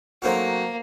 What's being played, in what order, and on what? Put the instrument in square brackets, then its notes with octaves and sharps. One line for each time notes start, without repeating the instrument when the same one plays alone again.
[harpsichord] F#3 A3 C4 D#4 F#4 [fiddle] A#3